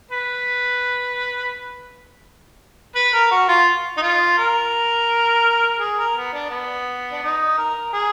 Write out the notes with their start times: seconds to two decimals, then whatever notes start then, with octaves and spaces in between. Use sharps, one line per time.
0.11 B4
2.95 B4
3.13 A#4
3.31 F#4
3.48 F4
3.97 D#4
4.02 F4
4.37 A#4
5.80 G#4
5.98 A#4
6.15 B3
6.33 D4
6.51 B3
7.12 D4
7.22 D#4
7.57 A#4
7.93 G#4